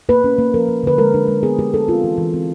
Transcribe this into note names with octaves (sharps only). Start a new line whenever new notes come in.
A#3 B4
C#4
A#3
F3 A#4
A#3
D3 B4
G#3 A#4
D4
G#3
B3 G#4
G#3 G4
D4 A4
C4 F4
E3
E3
C4